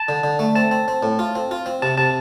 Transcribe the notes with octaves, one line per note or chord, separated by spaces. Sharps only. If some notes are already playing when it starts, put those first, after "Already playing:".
Already playing: A5
D3
D3
A3
C4 A5
C4
C4
A2
F4
C4
F4
C4
C3 A5
C3 A5